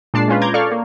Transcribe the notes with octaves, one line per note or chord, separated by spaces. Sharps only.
A#2 G#3 D4 D5 A5 C7
G#3 C#4 F4 B4
A#5 D6 G6 G#6
A4 D5 F5 C#6 F6
A#3